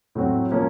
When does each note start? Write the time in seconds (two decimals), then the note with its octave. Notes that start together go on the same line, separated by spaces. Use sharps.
0.15 A2 F#3 C4 F#4
0.51 F3 A#3 C#4